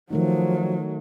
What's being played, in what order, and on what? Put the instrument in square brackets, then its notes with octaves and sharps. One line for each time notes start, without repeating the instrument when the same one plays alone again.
[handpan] D#3 A3 D#4 [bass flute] F3 [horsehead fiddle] F#3